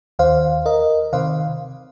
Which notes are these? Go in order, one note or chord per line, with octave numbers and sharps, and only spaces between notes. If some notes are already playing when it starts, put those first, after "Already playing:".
D#2 D#3 C5 F5
A#4 D#5
C3 D#3 C5 F5